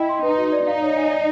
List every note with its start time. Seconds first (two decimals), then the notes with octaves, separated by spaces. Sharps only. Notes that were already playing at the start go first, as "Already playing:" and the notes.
Already playing: E4 D#5 G5
0.09 C6
0.23 D#4 B4
0.37 F#4
0.52 D5
0.67 D#4 F5
0.82 C#5
0.97 G#5
1.10 D5